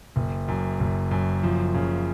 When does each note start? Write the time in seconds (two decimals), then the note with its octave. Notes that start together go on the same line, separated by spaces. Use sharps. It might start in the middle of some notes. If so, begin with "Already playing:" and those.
0.16 F#1
0.48 F#2
0.80 F#1
1.11 F#2
1.43 F3
1.74 C#3